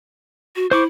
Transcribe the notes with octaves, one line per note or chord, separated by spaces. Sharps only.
F#4
E4 C5 C#6 D6